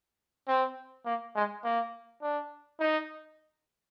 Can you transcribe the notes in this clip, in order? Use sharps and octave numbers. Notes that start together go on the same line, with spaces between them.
C4
A#3
G#3
A#3
D4
D#4